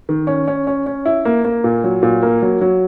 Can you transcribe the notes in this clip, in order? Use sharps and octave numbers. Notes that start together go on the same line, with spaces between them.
D#3
C#4
C#4
C#4
C#4
E4
A#3
A#3
A#2
F#3
A#2
A#3
F#3
F#3